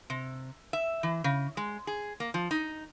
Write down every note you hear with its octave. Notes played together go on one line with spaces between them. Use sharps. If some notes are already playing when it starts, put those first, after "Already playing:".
C3
E5
E3
C#3
G#3
G#4
A#3
F3
D#4